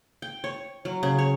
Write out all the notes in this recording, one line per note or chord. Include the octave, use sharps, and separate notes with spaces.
G5
C#5
F#3
C#3
C#5